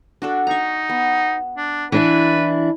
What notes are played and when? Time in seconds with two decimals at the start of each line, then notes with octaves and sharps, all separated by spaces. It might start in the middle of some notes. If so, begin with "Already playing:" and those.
0.22 D4 F#4 A4
0.47 D#4 A#5 C#6
0.89 B3
1.57 D4
1.92 E3 D4 E4 B4